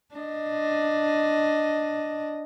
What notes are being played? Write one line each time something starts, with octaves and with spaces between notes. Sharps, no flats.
D4 D#5